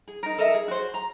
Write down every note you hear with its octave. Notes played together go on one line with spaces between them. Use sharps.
G#4
D#4 A#4
A4 A#4 D#5 E5
G#4
F#4 G#4 C5
A#5